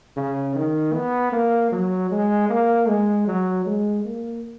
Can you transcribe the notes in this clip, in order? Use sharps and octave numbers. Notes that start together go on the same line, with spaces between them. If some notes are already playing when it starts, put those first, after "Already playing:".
C#3
D#3
B3
A#3
F#3
G#3
A#3
G#3
F#3
G#3
A#3